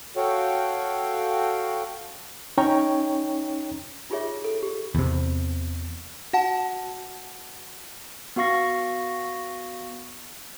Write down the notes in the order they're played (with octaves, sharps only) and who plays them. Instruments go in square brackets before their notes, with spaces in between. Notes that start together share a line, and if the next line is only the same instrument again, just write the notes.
[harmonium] F#4 A4 C#5 F5 G5
[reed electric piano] C#4 D#4 C#5 G5 A#5 C#6
[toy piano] D#4 F4 G4 G#4 C#5 E5
A4
G4
[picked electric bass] E2 C3
[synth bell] F#4 F#5 A5
[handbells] B3 F#4 F5 C#6 A#6